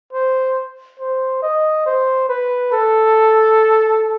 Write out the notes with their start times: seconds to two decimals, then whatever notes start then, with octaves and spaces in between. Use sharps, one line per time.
0.13 C5
1.00 C5
1.43 D#5
1.86 C5
2.29 B4
2.72 A4